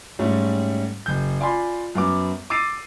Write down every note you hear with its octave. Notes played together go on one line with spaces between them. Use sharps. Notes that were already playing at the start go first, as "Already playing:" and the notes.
G#2 G3 A3 C#4
F#1 G6
F4 D5 G#5 B5 C6
F#2 B3 D6
D6 E6 A6 C7 D7 D#7